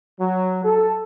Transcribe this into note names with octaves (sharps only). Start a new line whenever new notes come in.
F#3
A4